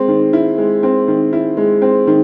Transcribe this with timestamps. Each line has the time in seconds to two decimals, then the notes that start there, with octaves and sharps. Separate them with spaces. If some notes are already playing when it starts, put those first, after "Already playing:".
Already playing: G#3 C4
0.08 D#3
0.33 E4
0.58 G#3
0.83 C4
1.08 D#3
1.33 E4
1.57 G#3
1.82 C4
2.07 D#3